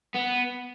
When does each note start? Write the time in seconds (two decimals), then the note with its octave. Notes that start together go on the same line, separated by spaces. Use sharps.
0.14 B3